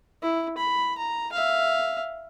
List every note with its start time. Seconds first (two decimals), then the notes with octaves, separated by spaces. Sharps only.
0.22 E4
0.58 B5
0.98 A#5
1.32 E5 F5